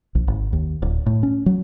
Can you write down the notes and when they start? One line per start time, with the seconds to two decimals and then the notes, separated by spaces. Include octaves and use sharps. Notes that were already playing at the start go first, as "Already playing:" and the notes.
0.15 A#1
0.28 G#1
0.53 D#2
0.82 D1
1.06 A2
1.23 C#4
1.46 F#3